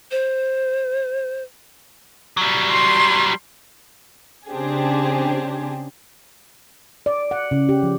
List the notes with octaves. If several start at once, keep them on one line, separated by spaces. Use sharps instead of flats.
C5
F#3 G3
C6
C#3 C4 D4 G4 G#4
D5
F#5
C#3
G4
F3